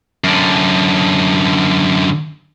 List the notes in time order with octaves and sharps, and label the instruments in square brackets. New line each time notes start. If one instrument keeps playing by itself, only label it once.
[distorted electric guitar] F#2 D3